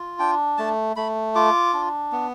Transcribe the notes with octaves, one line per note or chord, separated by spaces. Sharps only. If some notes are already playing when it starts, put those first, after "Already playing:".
Already playing: F4
D4 G5
A3 A5
A3 B5
F4 D6
D4
B3